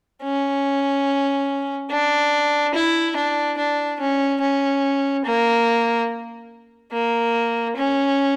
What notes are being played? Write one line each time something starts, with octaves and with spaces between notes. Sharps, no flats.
C#4
D4
E4
D4
D4
C#4
C#4
A#3
A#3
C#4